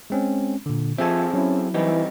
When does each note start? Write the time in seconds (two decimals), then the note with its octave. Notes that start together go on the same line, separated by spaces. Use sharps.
0.10 G#3 C4 C#4
0.66 A#2 D3
0.98 F3 C4 G#4 A4 E5 G#5
1.34 F#3 C#4 E4
1.74 E3 G3 C4 D#4